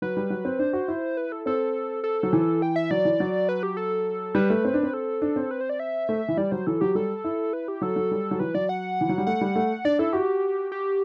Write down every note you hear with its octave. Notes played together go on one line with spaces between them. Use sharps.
F#3 B4
G3
F#3
C4
D4 C5
F#4
E4
B4
A4
C4 A4
A4
F#3
E3
G5
E5
F#3 D5
E3
F#3
B4
G4
A4
G3 B4
A3
C4
D4
C4
A4
D4
C4
B4
C5
D5
E5
A3
E3
G3 D5
F#3 C5
E3 A4
F#3 G4
G3 A4
E4
B4
G4
F#3 A4
F#3
G3
F#3
E3 B4
F#3 D5
F#5
E3
F#3
G3
A3 F#5
G3
A3
D4 D5
E4 A4
F#4 G4
G4